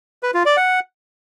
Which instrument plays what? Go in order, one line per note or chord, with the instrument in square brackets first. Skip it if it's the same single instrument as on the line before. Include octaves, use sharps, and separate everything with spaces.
[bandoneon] B4
F4
D5
F#5